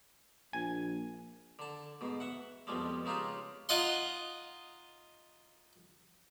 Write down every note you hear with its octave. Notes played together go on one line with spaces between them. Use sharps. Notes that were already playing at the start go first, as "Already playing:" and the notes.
A#1 G#5
D3 A5
G#2 B2
E5 F#5
F2 B2 F3 G3 G#3
C#3 G#3 D#4 F4 G4 A5
D#4 F4 D#5 F#5 C6